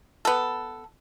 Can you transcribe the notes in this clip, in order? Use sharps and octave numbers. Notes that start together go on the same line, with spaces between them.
B3 A4